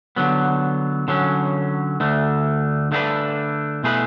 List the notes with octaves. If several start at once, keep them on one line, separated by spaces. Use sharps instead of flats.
D3 F#3 B3
D3 F#3 C#4
D2 D3 A3
D3 A3 D4 G#4 B4
B2 A3 E4 G#4 B4